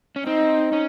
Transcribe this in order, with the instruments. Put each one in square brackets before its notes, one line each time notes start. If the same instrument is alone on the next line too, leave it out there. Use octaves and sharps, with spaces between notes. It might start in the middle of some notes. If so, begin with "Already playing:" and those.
[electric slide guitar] C#4
[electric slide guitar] C4 [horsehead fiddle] D#4
[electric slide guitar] C#4